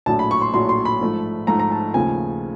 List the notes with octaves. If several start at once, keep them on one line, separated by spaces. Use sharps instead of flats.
A#1 A2 F#3 A5
B5
C#6
C6
A#1 A2 F#3 C6
C6
B5
G#2 F3 A3
G#2 F3 A3 A#5
A#5
A5
D#2 C#3 F3 A3 G#5